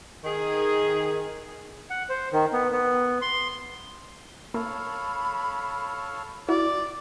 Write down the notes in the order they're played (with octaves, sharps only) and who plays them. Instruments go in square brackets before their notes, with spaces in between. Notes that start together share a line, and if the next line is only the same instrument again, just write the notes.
[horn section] D#3 G#4
[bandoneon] F#5
C5
D#3
B3
B3
C6
[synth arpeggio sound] A#3 [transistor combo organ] A4 C#5 F5 [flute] B5
[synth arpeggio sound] E4 F#4 [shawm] D5